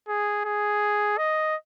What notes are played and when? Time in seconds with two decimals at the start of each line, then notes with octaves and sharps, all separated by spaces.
0.09 G#4
0.45 G#4
1.18 D#5